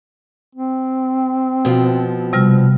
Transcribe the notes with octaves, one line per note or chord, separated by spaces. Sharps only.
C4
B2 F3
C3 G3 F6